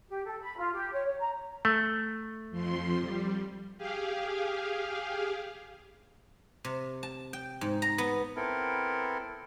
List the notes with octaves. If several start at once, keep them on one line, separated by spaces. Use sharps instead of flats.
G4
A4
B5
F4
G4
C#5
C#5
A#5
A3
F2 F3 C6
G3
G4 G#4 F5
C3
A5
G5
G#2
A#5
B3
B3 C4 E4 A4 A#4